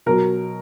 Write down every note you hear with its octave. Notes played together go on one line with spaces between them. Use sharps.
B2 F#3 A#4